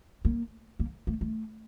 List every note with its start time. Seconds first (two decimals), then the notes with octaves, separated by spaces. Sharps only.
0.25 A#3
0.79 A#3
1.07 A3
1.21 A3